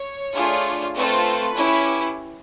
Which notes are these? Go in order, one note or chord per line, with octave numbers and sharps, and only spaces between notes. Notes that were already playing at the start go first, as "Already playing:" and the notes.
Already playing: C#5
A3 D4 F4 G#4
A3 C4 F4 A4 B4
C#4 E4 G4